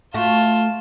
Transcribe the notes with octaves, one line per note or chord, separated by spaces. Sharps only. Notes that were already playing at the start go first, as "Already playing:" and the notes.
A3 F4 F#4 A5